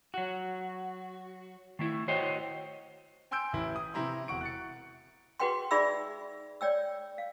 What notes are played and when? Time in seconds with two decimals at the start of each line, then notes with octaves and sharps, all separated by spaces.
0.14 F#3 F#4
1.79 D#3 A3 E4
2.08 F#4 C5 C#5 D#5 G5
3.31 G5 G#5 C6 E6 G6 D7
3.53 A1 E4
3.76 D#6
3.94 C3 E4 A#5 C6
4.28 E1 F#5 C#6 D7
4.41 F#6 A6 C#7
5.40 F#4 G#4 B4 F#5 G5 C6
5.71 D#4 G#4 D5 E5 B5 E6
6.61 C#5 D5 G5 E6
7.18 F5